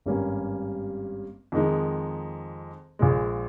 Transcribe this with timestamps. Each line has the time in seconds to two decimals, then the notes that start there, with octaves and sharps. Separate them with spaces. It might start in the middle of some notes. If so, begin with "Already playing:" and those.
0.06 G#1 G2 G3 A#3 C#4
1.52 F2 D#3 G#3 D#4
2.99 A#1 A#2 G#3